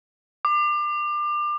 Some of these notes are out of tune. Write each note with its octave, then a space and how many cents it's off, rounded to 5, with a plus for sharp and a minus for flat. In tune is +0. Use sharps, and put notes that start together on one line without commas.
D6 +30